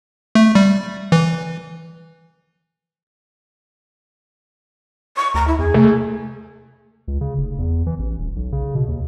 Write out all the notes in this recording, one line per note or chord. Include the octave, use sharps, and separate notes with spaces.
A3
G3
E3
C#6
D2 A#5
E4
E2 G#4
C3 A3
C#2
C#3
F1
E2
E3
A1
D#1
B1
C#3
B2
D#2